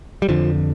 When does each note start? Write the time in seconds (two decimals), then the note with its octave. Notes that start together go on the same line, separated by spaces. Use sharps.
0.22 G3
0.28 F2 D3 F3